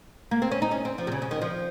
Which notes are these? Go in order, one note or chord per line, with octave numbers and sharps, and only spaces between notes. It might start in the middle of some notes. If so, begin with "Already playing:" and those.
A#3
C4
C#4
D#4
C#4
C4
F3
C3
C#3
C#3
D#3
F3